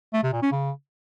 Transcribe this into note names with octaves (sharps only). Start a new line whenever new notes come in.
A3
C3
A#2
C#4
C#3